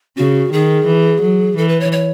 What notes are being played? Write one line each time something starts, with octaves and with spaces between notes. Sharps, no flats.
C#3 F#4
D#3 G#4
E3
F#3
E3 A4
B4
C#5
C#5